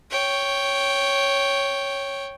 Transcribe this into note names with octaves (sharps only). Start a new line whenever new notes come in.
C#5 G5